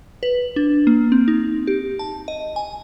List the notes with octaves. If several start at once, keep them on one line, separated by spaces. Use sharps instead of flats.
B4
D4
A#3
C4
D#4
G4
A5
D#5
G#5